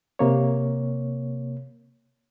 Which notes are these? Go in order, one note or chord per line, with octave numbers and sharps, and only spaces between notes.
C3 A#3 C#5